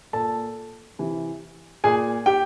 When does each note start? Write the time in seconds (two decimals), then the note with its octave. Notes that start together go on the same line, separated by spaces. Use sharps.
0.13 A#2 A4 A5
0.99 C3 E3
1.84 A#2 G#4 G#5
2.26 G4 G5